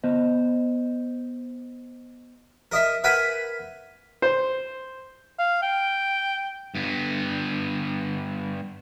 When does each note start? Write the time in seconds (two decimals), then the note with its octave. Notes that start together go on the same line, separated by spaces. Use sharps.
0.04 B3 C5 D#5
2.72 A#4 D#5 E5
3.04 A#4 B4 E5 F#5 G#5 B5
4.22 C5
5.39 F5
5.63 G5
6.75 G2 B3